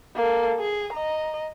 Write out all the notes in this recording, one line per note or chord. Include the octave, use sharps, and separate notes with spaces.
A#3 A4
G#4
D#5 A#5